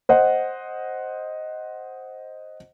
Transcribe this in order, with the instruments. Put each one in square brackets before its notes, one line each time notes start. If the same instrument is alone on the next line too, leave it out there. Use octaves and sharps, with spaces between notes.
[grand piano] C5 D#5 F#5